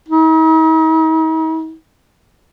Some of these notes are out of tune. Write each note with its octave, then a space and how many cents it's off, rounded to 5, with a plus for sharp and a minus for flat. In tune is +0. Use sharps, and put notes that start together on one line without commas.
D#4 +45